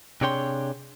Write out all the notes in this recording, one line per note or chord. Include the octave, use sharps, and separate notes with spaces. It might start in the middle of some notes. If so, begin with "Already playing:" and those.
C3 D4 G#4 C#5 G5 C6